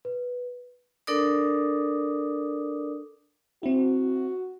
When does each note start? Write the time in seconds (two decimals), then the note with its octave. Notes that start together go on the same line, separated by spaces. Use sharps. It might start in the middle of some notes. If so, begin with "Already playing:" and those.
0.05 B4
1.07 D4 A4 A#4 D5 D6 D#6
3.63 C4 E4 F#4